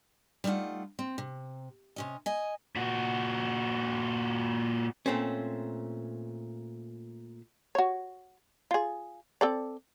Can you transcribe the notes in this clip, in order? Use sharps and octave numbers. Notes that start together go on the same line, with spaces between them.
G3 A3 D#4 F4 F#5
C4
C3
C3 C#4 D#5
D#5 G#5
A#2 F#4
A#2 A3 C4 C#4
F#4 C#5
F4 G#4
C4 A4 D5